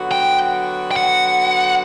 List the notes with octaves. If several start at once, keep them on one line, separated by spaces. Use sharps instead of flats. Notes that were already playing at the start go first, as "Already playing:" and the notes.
Already playing: D3 F#3 B3 F#4
G5
G5
F#5